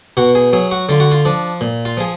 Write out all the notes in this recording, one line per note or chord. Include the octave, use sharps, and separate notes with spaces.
B2 F#4
G#4
F#3 G#4
F#4
D3 F4
F#4
F4
F3 D4
A#2
F4
F3 G#4